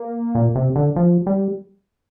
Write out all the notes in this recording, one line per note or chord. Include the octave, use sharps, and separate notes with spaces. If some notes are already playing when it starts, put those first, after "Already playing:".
Already playing: A#3
A#2
C3
D3
F3
G3